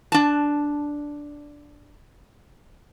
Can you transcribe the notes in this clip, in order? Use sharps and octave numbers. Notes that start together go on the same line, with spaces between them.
D4 A5